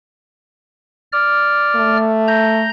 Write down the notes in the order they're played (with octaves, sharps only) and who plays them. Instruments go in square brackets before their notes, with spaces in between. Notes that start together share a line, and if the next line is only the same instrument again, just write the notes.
[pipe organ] D5 F6
[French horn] A3
[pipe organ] A#5 G6